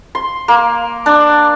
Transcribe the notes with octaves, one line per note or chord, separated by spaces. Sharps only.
C6
A#3
D4